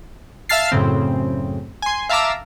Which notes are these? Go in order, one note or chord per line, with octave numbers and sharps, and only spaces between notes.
E5 F5 A5 F6 A6 C7
F#2 A2 C#3 C4
G#5 C6
E5 F5 A5 A#5 D6 E6